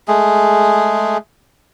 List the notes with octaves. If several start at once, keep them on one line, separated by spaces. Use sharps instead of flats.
G#3 A3 G#4